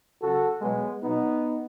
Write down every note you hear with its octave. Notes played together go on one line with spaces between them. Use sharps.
C#3 F#3 F#4 A4
B2 F#3 G#3 B3
B2 F#3 B3 D#4